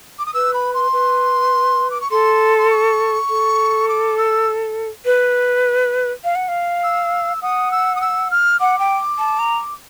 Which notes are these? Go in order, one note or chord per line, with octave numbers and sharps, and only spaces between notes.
D6
D#6
B4 E6
B5
C6
B4
D6
C#6
A4 C6
C6
C#6
A4
D6
E6
B4
F5
F#5
F5
E6
F#5 D#6
E6
D#6
E6
F6
F#5 D6
G5
A5
A#5